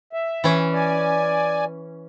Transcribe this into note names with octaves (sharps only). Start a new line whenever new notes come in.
E5
E3 C#4
D5 G#5